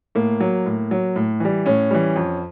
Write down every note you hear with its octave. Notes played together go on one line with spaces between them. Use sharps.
A2 A#3
F#3
A2
F#3
A2
E3 G3
A2 C#4
E3 G3
F2